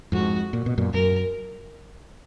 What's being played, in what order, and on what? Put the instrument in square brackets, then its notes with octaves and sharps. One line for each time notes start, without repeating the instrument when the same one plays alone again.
[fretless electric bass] F2 G#2 [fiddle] F#4
[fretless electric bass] A#2
B2
F#2 A#2
[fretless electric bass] F#2 [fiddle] A#4